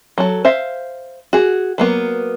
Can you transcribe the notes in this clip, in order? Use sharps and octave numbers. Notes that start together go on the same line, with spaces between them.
F#3 A4
C5 E5 F5
F#4 G#4
F#3 A#3 B3